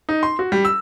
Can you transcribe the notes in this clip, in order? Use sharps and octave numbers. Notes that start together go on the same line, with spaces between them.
D#4
C6
F#4
G3
E6